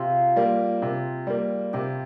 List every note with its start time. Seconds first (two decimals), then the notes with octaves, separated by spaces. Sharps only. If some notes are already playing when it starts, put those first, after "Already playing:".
Already playing: C3 F4 G#4
0.36 G3 A#3
0.82 C3
1.27 G3 A#3
1.73 C3 G4